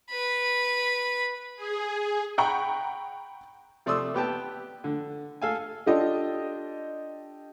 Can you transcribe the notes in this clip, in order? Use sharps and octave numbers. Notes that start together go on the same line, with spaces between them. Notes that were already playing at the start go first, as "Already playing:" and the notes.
B4 B5
G#4
F#5 G5 A#5 B5 C#6
C3 A3 D5 C6 D#6 E6
B3 G4 G5 A5
D3
A4 F5 G#5
D4 F4 G4 A4 D#5